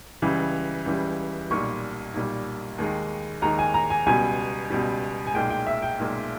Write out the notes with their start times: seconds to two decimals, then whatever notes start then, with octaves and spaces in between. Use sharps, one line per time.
0.22 C#2 C#3 E3 G3
0.86 C#2 C#3 E3 G3
1.50 B1 A#2 G3 C#6
2.14 B1 A#2 G3
2.78 D#2 D#3 G#3
3.42 D#2 D#3 G#3 A#5
3.59 G#5
3.74 A#5
3.90 G#5
4.06 C#2 B2 G3 G#5
4.70 C#2 B2 G3
5.27 G#5
5.34 B1 A#2 G#3 G5
5.50 G5
5.67 E5
5.82 G5
5.99 B1 A#2 G#3